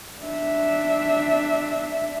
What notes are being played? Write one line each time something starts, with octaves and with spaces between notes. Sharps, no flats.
D4 E5